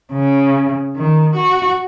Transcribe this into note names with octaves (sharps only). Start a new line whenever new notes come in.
C#3
D#3
F#4